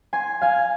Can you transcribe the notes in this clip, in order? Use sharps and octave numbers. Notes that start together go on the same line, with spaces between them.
G#5 C6
F5 G#5